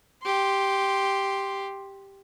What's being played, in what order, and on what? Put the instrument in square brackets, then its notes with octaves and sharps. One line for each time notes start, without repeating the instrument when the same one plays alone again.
[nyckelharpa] G4 C6